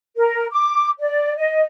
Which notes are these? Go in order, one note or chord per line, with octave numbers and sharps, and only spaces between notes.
A#4
D6
D5
D#5